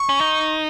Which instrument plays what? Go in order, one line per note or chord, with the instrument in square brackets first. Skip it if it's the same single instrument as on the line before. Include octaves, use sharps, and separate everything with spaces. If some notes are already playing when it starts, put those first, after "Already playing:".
Already playing: [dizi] C#6
[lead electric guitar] C#4
D#4